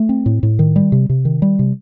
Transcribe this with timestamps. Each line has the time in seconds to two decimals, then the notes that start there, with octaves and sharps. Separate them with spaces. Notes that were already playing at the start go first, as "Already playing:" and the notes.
Already playing: A3
0.09 C4
0.26 A2
0.43 A2
0.59 D#3
0.76 G3
0.92 C3
1.09 C3
1.25 D#3
1.42 G3
1.59 C3